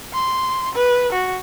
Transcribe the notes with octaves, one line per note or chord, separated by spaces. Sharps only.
C6
B4
F#4